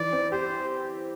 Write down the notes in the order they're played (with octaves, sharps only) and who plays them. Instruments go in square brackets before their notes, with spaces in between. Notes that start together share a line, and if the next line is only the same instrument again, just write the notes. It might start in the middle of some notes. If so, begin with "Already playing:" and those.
Already playing: [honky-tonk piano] E3 [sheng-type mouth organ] D5
[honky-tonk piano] C4
[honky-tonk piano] G4 [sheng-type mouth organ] C5